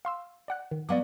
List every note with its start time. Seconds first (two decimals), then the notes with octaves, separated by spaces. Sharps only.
0.05 F5 C6 E6
0.48 D5 F#5 F#6
0.71 D#3
0.89 F#3 B3 D5 F5 D6